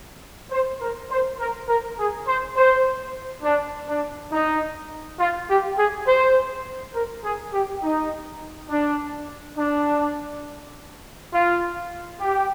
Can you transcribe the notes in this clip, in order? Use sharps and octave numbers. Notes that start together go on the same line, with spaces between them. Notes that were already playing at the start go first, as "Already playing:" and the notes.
C5
A#4
C5
A#4
A#4
G#4
C5
C5
D4
D4
D#4
F4
G4
G#4
C5
A#4
G#4
G4
D#4
D4
D4
F4
G4